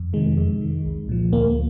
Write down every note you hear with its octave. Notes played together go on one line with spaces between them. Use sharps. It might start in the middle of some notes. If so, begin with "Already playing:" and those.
Already playing: F2
C3 D#3 G#3
F2
D#3
C2
A#2 F3
D2 A#3